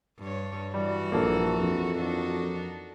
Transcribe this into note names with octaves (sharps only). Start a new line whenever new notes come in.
G2 C#5
E3 G3 F#4
A#1 A#3 A4
F2
D4 D#4 F#4